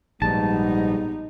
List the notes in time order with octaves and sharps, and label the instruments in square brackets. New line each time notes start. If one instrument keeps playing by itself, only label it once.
[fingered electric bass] A#1 [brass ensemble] G#2 G3 B3 [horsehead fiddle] D#4 [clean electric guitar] A5